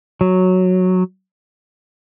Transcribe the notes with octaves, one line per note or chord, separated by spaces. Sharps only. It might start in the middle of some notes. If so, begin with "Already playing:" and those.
F#3